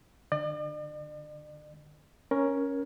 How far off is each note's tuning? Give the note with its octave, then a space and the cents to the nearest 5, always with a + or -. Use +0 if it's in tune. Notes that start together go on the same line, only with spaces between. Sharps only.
D3 +20 D5 +45
C#4 +0 A#4 +15